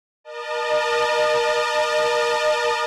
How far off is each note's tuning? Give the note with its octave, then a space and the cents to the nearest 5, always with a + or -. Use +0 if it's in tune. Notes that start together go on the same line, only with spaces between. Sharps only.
A#4 +30 D#5 -35 A5 +0